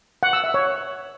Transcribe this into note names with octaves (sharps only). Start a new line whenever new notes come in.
F#5
E6
E5
C#5